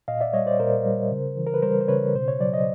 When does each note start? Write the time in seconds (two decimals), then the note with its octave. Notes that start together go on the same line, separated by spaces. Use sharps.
0.08 A#2 D#5 F5
0.21 D5 E5
0.33 G3 C#5 D#5
0.46 C5 D5
0.59 A#2 A#4 C5
0.86 G3
1.11 C#3
1.37 E3
1.46 A#4
1.54 B4
1.62 G3 A#4 C5
1.81 C5
1.88 C#3 B4 C#5
2.14 B2 C5
2.28 C#5
2.40 F#3 D5
2.54 D#5